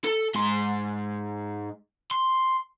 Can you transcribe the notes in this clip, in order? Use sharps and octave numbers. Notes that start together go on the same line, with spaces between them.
A4
G#2 C6
C6